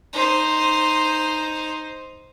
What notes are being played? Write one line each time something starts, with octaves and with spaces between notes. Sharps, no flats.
D#4 C5